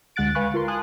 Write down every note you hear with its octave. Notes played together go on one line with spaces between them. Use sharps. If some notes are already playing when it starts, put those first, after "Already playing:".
D2 G#3 F#5 F#6 A6 D7
B4 F5 G#5 B5 C#6 F#6
F4 A#4 C6
G#5 A5 C6 D#6 F#6